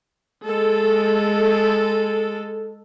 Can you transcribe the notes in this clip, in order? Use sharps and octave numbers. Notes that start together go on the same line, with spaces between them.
G#3 A4